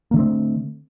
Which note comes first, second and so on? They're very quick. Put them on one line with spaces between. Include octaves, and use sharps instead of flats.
A#3 D3 A3 C4